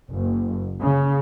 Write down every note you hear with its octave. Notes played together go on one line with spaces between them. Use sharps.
F#1
C#3